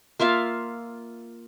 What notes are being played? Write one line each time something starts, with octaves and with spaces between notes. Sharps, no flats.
A#3 F4 E5 F5